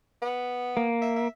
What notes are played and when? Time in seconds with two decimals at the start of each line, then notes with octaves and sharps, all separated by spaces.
0.22 B3
0.77 A#3
1.02 E5
1.16 E5